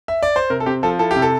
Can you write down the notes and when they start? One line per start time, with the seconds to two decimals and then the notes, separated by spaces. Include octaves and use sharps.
0.08 E5
0.23 D5
0.36 C5
0.50 C3 A#4
0.60 A4
0.66 C4 G4
0.83 F3 A4
0.99 E4 A4
1.11 G4
1.16 C3
1.22 A4